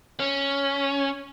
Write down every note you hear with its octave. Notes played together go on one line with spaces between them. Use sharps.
C#4